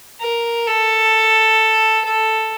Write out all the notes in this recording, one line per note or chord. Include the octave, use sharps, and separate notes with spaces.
A#4
A4
A4